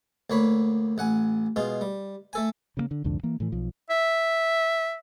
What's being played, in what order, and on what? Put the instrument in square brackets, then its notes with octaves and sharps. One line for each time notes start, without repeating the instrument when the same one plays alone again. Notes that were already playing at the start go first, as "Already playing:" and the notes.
[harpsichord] D2 A#3 C#5 B5
A1 F#5 G#5
B2 G#3 F4
G3
A3 A4 G#5
[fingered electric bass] C#3 G3 A#3
D3
C2 F2 G#2 D3
E3 A#3
A2 E3
B1 F3
[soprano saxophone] E5